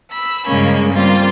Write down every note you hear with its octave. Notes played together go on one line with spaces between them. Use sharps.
B5 E6
G2 C#3 G#3 A#3 C#4
G3 A#3 C4 F4